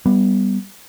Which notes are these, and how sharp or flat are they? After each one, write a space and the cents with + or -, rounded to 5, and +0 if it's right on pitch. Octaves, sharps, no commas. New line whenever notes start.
G3 +0 B3 +0